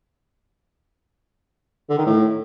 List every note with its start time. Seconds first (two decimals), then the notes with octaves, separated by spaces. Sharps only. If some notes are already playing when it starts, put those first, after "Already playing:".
1.90 D3
1.98 D#3
2.06 A2